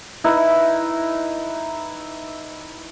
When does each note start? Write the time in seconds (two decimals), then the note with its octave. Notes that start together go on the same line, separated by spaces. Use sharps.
0.24 D#4 E4 B4